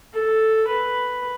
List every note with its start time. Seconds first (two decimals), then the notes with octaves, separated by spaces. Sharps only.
0.13 A4
0.67 B4